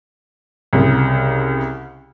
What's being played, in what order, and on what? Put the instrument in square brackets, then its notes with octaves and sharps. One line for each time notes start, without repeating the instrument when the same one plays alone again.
[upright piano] C2 C#3